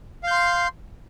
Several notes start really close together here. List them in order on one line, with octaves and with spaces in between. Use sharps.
F5 G6 C6